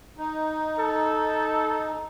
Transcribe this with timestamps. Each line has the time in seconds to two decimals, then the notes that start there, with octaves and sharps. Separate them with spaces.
0.18 D#4
0.79 A4